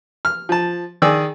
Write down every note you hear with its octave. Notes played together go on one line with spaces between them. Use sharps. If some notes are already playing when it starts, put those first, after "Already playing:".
F6
F3 A5
D#3 G#4 D5 E6